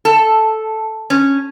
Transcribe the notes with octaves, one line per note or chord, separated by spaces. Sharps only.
A4
C#4